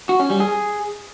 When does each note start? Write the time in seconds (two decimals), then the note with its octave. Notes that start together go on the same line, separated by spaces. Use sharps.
0.09 F#4
0.19 C#4
0.30 G3
0.40 G#4